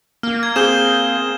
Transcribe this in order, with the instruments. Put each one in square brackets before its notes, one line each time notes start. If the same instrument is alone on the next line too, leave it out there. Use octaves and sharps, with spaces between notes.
[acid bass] A#3 [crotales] F6
[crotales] G#6
[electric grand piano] C4 G#4 G6 [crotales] E7 G7